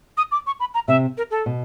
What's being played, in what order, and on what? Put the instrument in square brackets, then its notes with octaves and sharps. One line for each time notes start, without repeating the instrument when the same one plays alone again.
[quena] D#6
D6
C#6
B5
A#5
[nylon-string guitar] C3 [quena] E5
[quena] A#4
A4
[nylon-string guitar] B2